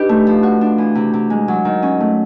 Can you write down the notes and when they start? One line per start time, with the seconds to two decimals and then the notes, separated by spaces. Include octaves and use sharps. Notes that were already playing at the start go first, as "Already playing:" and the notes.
Already playing: D4 D#4 G4 B4
0.09 A3
0.27 F3
0.43 F#4
0.61 D4
0.78 E3
0.95 C3
1.14 C3
1.30 G#3
1.48 F#3
1.65 D#3
1.83 C#4
2.00 A3